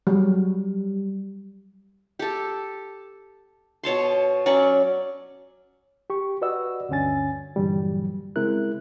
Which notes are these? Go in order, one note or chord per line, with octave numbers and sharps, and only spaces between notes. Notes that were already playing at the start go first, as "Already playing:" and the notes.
F#3 G3
G4 A4
B2 C#5 A5 C6
F#3 C#4 D5 C#6
G4 C#6
F#4 B4 D5 D#5 F#5 E6
D2 G2 D3 C#4 G#5 A6
G2 A#2 D3 E3 F#3 G3
C#3 G#3 C4 E4 A#4 F#6